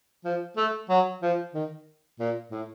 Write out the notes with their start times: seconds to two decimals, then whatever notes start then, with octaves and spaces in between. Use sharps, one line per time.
0.25 F3
0.57 A3
0.89 F#3
1.22 F3
1.54 D#3
2.20 A#2
2.51 A2